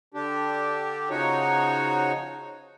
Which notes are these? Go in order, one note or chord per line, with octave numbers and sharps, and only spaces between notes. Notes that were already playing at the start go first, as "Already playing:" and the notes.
D3 D4 G4
C#3 F3 D#4 F#4 C#5